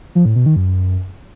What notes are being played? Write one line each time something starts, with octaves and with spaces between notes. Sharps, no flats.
F3
A2
B2
D#3
F#2